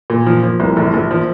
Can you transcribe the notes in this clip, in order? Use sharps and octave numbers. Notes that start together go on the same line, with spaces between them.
A#2
F3
F3
C2
A#1
A#1
F3